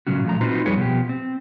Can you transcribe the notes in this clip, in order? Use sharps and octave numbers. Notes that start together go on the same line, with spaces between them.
A#2 C#3 F#3 C#4 F#4
A#2 F3 A3 A#5
C4 D#4 F4 F#4 B4 C5
F2 G3 G#4 B4 C#5
B2 F3 G4
C4